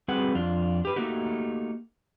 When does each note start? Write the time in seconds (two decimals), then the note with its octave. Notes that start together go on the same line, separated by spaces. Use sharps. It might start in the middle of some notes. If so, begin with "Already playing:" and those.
0.08 G3 C4 F#4 G#4 B4 F#5
0.35 F2 D4 F4
0.85 G4 B4
0.96 A3 A#3 D#4 F#4 G4